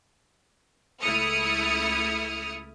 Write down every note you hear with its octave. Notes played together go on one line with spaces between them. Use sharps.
C#2 A3 E4 D#6 F6 C#7